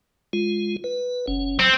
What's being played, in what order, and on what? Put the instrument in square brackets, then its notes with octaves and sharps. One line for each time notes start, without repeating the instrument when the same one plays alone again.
[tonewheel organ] G#3 F4
B4
F#1 C#4
[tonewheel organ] F#3 [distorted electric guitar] C4